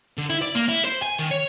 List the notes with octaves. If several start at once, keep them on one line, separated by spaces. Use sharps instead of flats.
D3
E4
D5
A#3
E4
C5
G#5
D#3
C#5